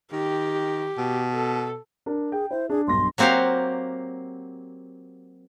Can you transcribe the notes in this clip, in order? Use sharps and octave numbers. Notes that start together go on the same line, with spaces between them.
D#3 G4
B2
A4
D4 A#4
G#4 G5
E4 C5
D4 G#4
B1 G2 C6 A#6
F#3 A#3 C4 F#4 G4 F5